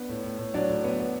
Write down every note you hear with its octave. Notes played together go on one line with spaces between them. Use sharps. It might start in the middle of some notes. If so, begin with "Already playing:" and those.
Already playing: B3 D4
A2
A2
A2
F#3 D4 D5
A2
B3
B3